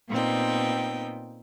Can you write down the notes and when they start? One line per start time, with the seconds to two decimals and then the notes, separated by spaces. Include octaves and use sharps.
0.10 A#2 B3 C4 D#4 G5